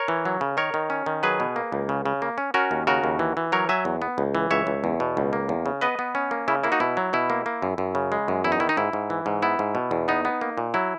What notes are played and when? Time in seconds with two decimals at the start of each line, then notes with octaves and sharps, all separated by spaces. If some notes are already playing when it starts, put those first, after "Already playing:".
Already playing: A#4 C#5
0.08 E3
0.25 F#3
0.41 C#3
0.57 D#3 A#4 C#5
0.74 D#3
0.90 C#4
1.06 D#3
1.23 F#3 G#4 B4
1.40 B2
1.56 A#3
1.72 C#2
1.89 C#3
2.06 C#3
2.22 A#3
2.38 C#4
2.54 C#4 F#4 A#4
2.71 D#2
2.87 C#3 F#4 A#4
3.04 D#2
3.19 E3
3.37 E3
3.52 F#3 A#4 C#5
3.69 F#3 E5 G#5
3.85 E2
4.02 B3
4.18 C#2
4.35 E3
4.51 C#2 C#5 E5
4.67 C#2
4.84 E2
5.00 B2
5.17 C#2
5.33 A#3
5.49 E2
5.66 C#3
5.81 B3 B4 D#5
5.99 B3
6.15 C#4
6.31 A#3
6.48 C#3 E4
6.64 A#3 E4
6.72 D#4 F#4
6.80 B2 E4
6.97 F#3
7.13 B2 E4
7.30 A#3
7.46 A#3
7.62 F#2
7.78 F#2
7.95 C#3
8.12 G#3
8.28 F#2
8.44 E2 E4
8.52 D#4
8.60 D#3 E4
8.69 D#4
8.77 G#2 E4
8.93 G#2
9.10 E3
9.26 G#2
9.42 B3 E4
9.59 G#2
9.75 B2
9.91 E2
10.08 B3 D#4
10.25 B3
10.41 A#3
10.58 A#2
10.74 F#3 E4